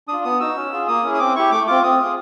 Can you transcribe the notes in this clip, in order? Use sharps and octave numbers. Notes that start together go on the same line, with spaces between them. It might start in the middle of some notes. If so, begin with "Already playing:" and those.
D4 F4 D#6
B3 D#6
D#4 F#4 E6
C#4
F4 G#4
A#3 D#6
C#4 E4 G#4
D#6
C4 D6
E4 G4 C#6
A3 D6
C4 F4 D6
C4 D#6
F4 G#4